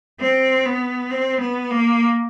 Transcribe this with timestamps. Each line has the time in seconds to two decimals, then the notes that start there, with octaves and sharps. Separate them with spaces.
0.20 C4
0.65 B3
1.10 C4
1.40 B3
1.71 A#3